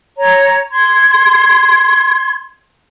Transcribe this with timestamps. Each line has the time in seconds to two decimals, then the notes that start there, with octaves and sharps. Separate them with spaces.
0.18 C#5 A#5
0.71 C6 G#6